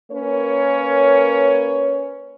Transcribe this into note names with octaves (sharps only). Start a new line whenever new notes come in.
A#3 C#4 A#4 B4 C#5